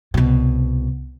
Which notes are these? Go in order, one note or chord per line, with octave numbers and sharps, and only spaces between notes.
C2 B2